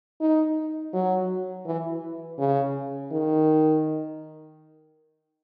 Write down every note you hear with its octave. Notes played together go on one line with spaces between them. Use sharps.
D#4
F#3
E3
C#3
D#3